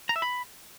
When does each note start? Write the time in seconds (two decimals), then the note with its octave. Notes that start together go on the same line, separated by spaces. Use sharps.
0.09 A#5
0.16 E5
0.22 B5